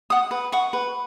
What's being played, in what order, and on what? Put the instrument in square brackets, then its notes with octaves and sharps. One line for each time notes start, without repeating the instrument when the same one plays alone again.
[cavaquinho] F#5 D#6
B4
F#5 C#6
B4